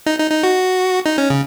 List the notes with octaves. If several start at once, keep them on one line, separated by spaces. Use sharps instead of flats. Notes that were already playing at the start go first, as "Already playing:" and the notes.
D#4
D#4
D#4
F#4
D#4
C#4
C#3